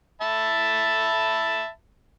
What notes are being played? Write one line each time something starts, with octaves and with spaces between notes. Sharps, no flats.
E5 A5 B5